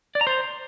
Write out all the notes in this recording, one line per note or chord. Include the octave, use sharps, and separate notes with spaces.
D5
A#5
C5